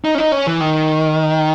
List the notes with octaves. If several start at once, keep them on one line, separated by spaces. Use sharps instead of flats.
D#4
C#4
D#4
C#4
E3
D#3